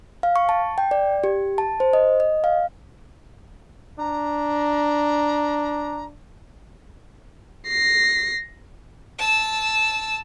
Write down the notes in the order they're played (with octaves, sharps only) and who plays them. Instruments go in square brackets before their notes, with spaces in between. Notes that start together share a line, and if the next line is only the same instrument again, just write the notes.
[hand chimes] F5
C#6
A5
G5
D5
G4
A5
C5
D#5
D#5
F5
[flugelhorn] D4 [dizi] A#5
[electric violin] A#6 C7
[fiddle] A5 E6